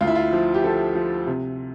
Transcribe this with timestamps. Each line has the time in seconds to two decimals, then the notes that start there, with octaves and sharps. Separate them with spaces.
0.01 D2 F4
0.07 E4
0.15 F4
0.33 F3
0.54 G4
0.64 F3 A4
0.95 F3
1.27 C3